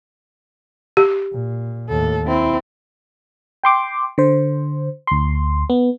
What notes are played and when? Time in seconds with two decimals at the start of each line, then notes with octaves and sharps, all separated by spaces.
0.97 G4
1.32 A#2
1.89 D#2 A2 A4
2.28 C4 E4
3.64 G5 C6 D6
4.18 D3 C5
5.07 D2 C6
5.70 B3